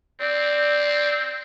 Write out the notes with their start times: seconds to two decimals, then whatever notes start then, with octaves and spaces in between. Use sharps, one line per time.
0.20 C4 D5